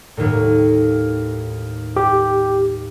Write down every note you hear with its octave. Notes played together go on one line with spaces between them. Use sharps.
D#2 A2
G4